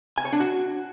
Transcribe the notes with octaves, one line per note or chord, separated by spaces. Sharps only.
G#5
C#5
D4
F#4